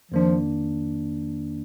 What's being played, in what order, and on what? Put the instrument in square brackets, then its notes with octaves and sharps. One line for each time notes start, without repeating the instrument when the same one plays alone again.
[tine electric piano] F2 D#3 A#3 D4 [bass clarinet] F3